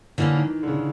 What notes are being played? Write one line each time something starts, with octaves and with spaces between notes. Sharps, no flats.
D3 E3 G3 A#3 C#4
D#3
D3
C#3